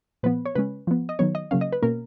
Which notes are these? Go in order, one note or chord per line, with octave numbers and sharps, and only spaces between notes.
A#2 F3 B3 B4
C#5
C#3 G#3 C#4 B4
F3 B3
D#5
D#3 F#3 B3 C#5
D#5
C#3 F#3 A#3 C#4 F5
D#5
B4
B2 A#3 C#4 A#4